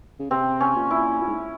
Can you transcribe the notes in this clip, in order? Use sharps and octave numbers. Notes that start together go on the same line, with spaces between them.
C#3
C3 C4
C#4
A#2
E4
A#2
G#2